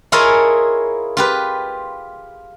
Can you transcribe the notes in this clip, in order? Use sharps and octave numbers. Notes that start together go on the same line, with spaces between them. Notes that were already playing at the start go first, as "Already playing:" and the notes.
E4 F4 G#4 A#4 C#5 D#5
F4 G4 B4